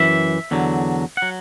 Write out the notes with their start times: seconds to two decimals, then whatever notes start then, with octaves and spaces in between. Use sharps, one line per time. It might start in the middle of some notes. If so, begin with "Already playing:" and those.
Already playing: F#2 E3 E5
0.51 E2 D3 F#3
1.17 F#3 F#5